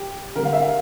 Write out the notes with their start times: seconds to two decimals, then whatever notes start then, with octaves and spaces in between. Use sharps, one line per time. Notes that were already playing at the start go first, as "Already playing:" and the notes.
Already playing: G4
0.36 D3 G3 A#4
0.45 F5
0.53 E5
0.61 F5